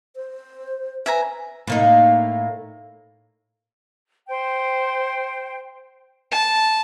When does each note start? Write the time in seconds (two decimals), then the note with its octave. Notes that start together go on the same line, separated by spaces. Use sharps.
0.16 C5
1.06 B4 E5 G#5 A#5
1.67 A2 A#3 D#4
4.27 C5 G5
6.32 A5